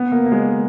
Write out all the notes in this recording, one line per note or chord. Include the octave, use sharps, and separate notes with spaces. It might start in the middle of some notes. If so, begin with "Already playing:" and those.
Already playing: B3
A#3
A#3
G#3